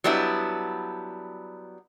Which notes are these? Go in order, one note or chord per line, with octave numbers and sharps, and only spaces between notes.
F#3 G3 B3 D4 E4